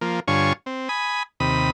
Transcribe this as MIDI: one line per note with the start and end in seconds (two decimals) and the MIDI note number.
0.01 0.20 53
0.01 0.20 58
0.28 0.53 43
0.28 0.53 50
0.28 0.53 65
0.28 0.53 73
0.28 0.53 80
0.28 0.53 85
0.66 0.89 60
0.89 1.23 80
0.89 1.23 83
0.89 1.23 87
1.40 1.70 39
1.40 1.70 48
1.40 1.70 83
1.40 1.70 87